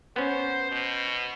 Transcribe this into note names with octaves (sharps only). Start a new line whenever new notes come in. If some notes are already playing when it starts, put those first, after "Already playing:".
B3 C#4 C5
B2